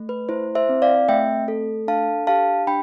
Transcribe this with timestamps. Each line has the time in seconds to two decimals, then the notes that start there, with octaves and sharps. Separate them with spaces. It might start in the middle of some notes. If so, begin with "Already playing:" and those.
Already playing: A3
0.09 B4
0.29 E4 C5
0.55 C5 E5
0.69 C4
0.82 D5 F5
1.09 A3 E5 G5
1.48 A4
1.87 D4 F5 A5
2.27 G4 F5 A5
2.67 D4 G5 B5